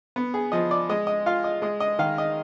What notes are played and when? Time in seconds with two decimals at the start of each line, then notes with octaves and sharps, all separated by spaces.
0.16 B3
0.34 G#4
0.52 F3 D#5
0.71 D5
0.89 G#3 D#5
1.07 D#5
1.26 F4 F5
1.44 D#5
1.62 G#3 D#5
1.80 D#5
1.99 D#3 F5
2.18 D#5